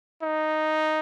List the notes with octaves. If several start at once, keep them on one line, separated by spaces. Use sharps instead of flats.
D#4